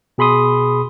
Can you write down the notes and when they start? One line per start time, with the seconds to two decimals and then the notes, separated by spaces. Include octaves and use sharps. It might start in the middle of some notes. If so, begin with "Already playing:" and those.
0.18 B2 G#4 B5 C6 D#6